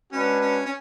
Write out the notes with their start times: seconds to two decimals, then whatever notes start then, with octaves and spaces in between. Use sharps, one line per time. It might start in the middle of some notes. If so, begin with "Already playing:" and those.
0.12 G#3 C#4 D4 F#4 B4
0.40 C#4
0.66 C#4